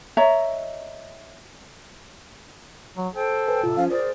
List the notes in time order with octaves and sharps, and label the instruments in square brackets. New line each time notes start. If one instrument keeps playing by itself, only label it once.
[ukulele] C#5 D#5 E5 A#5
[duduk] F#3
[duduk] A4 [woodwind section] C5 G5
[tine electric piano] B4 G#5
[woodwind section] A2 C3 [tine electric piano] F4
[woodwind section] F3 C#4 [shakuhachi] F5
[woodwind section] G#4 A#4 D5 [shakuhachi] C5